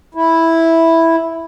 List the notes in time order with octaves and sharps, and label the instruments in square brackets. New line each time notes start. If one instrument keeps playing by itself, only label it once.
[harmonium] E4